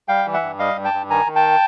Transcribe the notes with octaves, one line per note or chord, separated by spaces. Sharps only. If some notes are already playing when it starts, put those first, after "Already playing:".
G3 F5 G5
E3
E5 F#5
G2
G3 D#5 F5
G2
G5 A5
G2
D#3 G#5 A#5
D#3
G5 A5